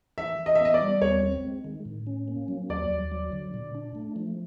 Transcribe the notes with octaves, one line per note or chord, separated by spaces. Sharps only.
E3 E5
E3
D#5
E5
B3 D#5
D5
G3
D#2 C#5
C4
G#3
D#3
A2
C#4
A#3
F#3
D#2 D5
D#2
F#3
D3
A#2
D4
A3
F3